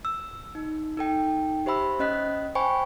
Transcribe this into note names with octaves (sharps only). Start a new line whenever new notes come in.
E6
D#4
D#4 A4 G5
G4 C5 E5 B5 E6
C#4 D#5 F#6 B6
C5 G5 G#5 B5 C#6